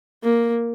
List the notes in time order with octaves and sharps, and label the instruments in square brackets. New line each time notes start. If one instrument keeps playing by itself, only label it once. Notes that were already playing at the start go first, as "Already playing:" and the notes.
[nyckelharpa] A#3